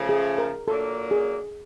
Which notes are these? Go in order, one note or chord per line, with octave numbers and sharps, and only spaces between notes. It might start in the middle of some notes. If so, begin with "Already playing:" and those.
Already playing: C#3 F3 A3
G#4
A#4
A#2 F#3 A#3 D4 A4
G#4